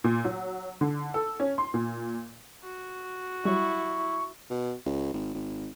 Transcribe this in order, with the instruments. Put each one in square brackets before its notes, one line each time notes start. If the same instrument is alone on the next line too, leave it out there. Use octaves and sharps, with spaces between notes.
[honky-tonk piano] A#2
F#3
D3
A4
C#4
C6
A#2
[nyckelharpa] F#4
[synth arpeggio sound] F#3 G3 [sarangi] E4 [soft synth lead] C#6
[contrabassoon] B2
C#2
G#1
G#1